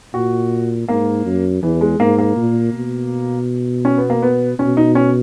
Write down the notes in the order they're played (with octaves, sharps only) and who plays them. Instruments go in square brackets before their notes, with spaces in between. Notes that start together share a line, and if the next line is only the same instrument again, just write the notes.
[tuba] A#2 [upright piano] F#4
[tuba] G#2 [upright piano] A#3
[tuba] F#2
[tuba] E2 [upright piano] E3
[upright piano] G#3
[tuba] G#2 [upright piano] A#3
[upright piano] A#3
[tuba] A#2
B2
[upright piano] C#4
B3
A#3
B3
[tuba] B2 [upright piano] C#4
[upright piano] D#4
C#4